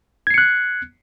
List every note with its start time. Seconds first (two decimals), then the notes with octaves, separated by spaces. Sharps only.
0.27 G#6
0.30 C7
0.34 C#7
0.38 F#6